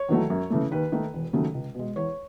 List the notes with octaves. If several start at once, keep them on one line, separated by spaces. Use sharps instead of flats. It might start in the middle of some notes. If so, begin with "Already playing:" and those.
Already playing: C#5
E2 D#3 F#3 A3
F#2
C#3 E3 A3
D#2 B4
D#3 A3
E1
D#2 C#3 F#3 A3
C#2
B2 G#3
E2 C#5